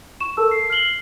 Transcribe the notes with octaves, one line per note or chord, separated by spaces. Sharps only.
C#6 E7
A4 A#4 A5 E6
C7
F6 C7 F#7 G7